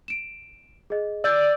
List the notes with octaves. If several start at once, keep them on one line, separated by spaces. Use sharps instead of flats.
D7 E7
G#4 D#5
D5 E6 G6 A6